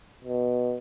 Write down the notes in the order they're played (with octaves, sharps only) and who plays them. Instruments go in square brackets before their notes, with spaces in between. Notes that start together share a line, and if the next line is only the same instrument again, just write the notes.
[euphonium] B2